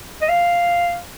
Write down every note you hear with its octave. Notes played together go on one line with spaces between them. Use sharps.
D#5
F5